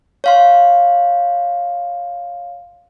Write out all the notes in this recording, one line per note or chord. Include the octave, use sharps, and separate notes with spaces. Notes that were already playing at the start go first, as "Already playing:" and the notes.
C#5 F5 C6